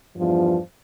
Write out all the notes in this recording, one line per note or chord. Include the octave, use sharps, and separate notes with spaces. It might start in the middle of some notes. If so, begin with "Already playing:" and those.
E2 G2 F3